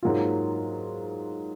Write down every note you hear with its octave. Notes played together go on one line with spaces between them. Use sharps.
G#2 F#3 A#3 F4